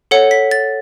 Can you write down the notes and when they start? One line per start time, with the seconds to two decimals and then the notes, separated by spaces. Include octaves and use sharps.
0.11 A4 C#5 F#5 C#7
0.31 B6
0.51 A6